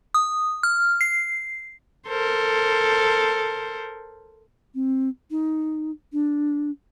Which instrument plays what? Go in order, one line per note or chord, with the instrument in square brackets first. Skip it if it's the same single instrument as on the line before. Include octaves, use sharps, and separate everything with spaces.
[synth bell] D#6
F6
C7
[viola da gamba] A4 A#4 C5
[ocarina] C4
D#4
D4